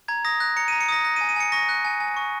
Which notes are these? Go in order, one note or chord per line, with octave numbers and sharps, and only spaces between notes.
A#5 G#6
D#6 A#6
F#6 A#6
A#5 C#7
A#5 D#7
C#7
D#6 A#6
F#6 A#6
D#7
G#5
D#7
G#5 C#7
C#6 A#6
F#6
G#5
G#5
C#6